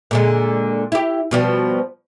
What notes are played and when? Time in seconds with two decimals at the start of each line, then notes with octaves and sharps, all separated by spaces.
0.11 A#2 D3 G#3
0.92 E4 G4
1.31 B2 F3 G3